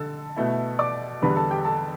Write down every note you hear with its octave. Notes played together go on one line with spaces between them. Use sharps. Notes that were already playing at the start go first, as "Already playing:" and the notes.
Already playing: D3 A4 A5
B2 A3 E4
D5 D6
E2 D3 G3 D4 B4 B5
A4 A5
G4 G5
A4 A5